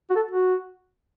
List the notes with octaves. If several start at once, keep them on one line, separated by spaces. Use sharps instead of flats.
F#4
A4
F#4